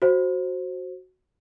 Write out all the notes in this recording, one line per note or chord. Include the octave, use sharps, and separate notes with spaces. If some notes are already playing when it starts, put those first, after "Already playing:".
F#4 C5